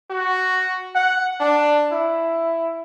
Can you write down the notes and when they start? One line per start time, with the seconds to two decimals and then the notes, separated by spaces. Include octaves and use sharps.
0.10 F#4
0.95 F#5
1.40 D4
1.91 E4